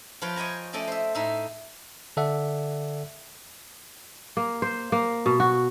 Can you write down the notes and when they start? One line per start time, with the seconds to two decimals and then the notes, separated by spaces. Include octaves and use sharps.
0.22 F3 F4 B4 C#5 G5
0.36 C#5 D#5 G5 G#5 A#5
0.73 A3 C#4 A4 D5 D#5 G5
0.88 C5 E5
1.15 A2 D#4 E5
2.17 D3 A4 D5 E5 F#5
4.37 A#3
4.62 C5
4.92 A#3
5.26 B2
5.40 F#4